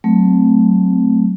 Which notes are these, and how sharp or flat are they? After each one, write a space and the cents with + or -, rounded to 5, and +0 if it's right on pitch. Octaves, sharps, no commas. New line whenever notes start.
F#3 +10 A3 +0 C4 +0